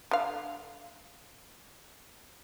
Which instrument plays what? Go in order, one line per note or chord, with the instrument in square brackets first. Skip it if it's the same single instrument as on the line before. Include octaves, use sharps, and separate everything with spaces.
[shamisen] D3 F5